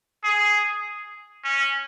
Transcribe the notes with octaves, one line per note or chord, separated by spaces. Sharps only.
G#4
C#4